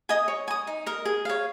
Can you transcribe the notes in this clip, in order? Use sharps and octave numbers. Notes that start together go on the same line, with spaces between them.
D#5 G#5 D#6
C#5
G#5 D#6
D#4
A#4 D#5
G#4
C#5 F5